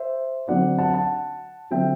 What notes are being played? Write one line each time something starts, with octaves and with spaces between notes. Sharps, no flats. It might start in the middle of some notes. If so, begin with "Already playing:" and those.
Already playing: C5 E5
D3 F#3 C4 D5 F#5
F#5 A5
F#5 A5
D3 F#3 C4 E5 G5